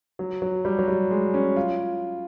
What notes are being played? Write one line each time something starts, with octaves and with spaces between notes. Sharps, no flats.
F#3
F#3
G3
F#3
G3
G#3
C#4
F4